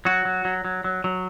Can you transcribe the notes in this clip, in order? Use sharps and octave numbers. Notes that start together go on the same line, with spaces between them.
F#3 F#4
F#3
F#3
F#3
F#3
F#3